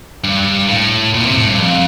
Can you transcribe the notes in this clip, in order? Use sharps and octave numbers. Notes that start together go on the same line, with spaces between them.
G2
A2
A#2
C3
A2
G2
F2